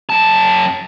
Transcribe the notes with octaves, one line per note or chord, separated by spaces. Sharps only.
F#2 A5